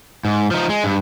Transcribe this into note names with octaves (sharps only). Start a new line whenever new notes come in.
G#2
F3 D#4
G#3
G2